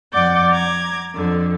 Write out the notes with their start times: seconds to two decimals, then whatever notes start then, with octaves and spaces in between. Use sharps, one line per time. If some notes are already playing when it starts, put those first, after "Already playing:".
0.13 F2 D5 F#5 D6 G6 A6
0.51 A#5 D6 G#6
1.15 F2 D3